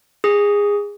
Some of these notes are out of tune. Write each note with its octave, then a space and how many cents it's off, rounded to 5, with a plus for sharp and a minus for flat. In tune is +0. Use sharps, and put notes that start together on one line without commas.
G#4 -20 D#6 +0